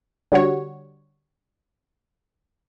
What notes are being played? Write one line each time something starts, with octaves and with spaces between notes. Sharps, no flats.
D3 G3 F#4 C#5